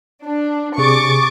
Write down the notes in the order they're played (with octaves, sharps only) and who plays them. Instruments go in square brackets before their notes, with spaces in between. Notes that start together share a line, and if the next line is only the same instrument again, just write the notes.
[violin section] D4
[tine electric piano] C3 G#4 [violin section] C#6 D6 A6